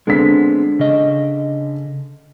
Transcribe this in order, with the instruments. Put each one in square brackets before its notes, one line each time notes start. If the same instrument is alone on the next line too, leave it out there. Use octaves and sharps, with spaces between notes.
[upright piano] D3 B6 [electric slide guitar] G#3 B3 C4
[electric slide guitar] C#3 D#5